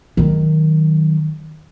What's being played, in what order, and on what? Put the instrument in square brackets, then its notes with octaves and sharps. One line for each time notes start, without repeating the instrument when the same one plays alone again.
[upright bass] D#3 F#3